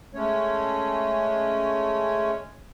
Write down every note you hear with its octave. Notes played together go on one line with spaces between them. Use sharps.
G#3 A3 C#4 C#5